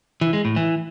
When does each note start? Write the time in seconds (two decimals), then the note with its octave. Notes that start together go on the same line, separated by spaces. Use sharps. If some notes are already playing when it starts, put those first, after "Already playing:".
0.21 E3
0.33 G#3
0.45 A2
0.56 E3